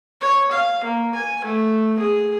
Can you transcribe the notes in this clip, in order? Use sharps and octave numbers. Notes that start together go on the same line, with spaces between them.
C#5
F5
A#3
G#5
A3
G#4